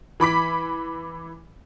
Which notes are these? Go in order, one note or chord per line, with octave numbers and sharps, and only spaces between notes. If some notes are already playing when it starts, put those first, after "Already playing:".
E3 B5 D6 B6